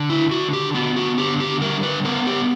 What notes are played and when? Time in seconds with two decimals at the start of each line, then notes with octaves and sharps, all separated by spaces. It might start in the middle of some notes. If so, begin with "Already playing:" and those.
Already playing: D3
0.10 E4
0.31 D3 F#4
0.53 G4
0.75 B3 F#4
0.96 F#4
1.18 D3 G4
1.40 G4
1.61 G3 A#4
1.83 B4
2.05 B3 A#4
2.27 G4